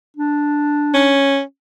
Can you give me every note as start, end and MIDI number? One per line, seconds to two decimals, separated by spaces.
0.16 1.16 62
0.94 1.41 61